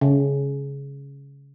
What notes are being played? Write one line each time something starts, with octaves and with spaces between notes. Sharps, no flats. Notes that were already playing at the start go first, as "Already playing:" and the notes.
C#3